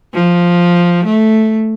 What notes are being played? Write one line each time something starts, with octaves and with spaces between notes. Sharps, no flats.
F3
A3